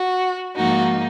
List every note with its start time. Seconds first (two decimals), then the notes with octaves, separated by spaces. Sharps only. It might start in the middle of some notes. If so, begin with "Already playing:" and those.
Already playing: F#4
0.56 G#2 F3 A#3 D#4 F#4